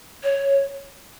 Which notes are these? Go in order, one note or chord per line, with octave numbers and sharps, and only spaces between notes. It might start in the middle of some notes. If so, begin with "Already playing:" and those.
C#5